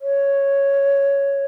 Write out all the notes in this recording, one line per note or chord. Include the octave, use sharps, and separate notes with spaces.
C#5